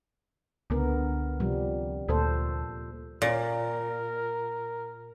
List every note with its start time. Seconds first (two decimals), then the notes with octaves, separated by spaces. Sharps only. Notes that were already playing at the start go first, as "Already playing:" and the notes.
0.70 C#2 D3 B3 A#4
1.40 C3 F3 G3
2.08 D2 A#2 A4 C5
3.22 A#2 A#4